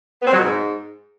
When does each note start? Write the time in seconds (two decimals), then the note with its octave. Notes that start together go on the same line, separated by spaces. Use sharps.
0.21 B3
0.26 C4
0.32 F#3
0.37 B2
0.42 G#2